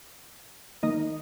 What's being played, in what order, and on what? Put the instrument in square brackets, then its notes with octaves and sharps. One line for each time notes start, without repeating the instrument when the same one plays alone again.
[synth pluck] D#3 A#3 D#4 D#5